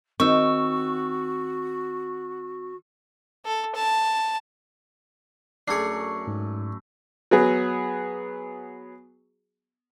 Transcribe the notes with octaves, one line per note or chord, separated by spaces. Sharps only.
D#3 C4 F#4 C#6 E6
A4
A5
F#2 A3 D4 G#4 C7 C#7
G#2
F#3 B3 G#4